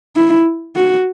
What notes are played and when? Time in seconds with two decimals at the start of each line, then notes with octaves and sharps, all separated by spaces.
0.16 E4
0.76 F#4